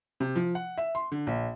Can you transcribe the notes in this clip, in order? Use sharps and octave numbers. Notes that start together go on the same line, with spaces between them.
C3
F3
F#5
E5
C6
D3
A#1